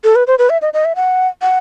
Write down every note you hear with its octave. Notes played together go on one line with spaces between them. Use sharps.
A4
B4
C5
B4
E5
D#5
D#5
E5
F#5
F#5